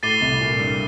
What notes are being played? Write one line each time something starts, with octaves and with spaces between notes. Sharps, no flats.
A2 A3 D6 A6 C7 D#7 G7
C2 C3
A#2
G2 G3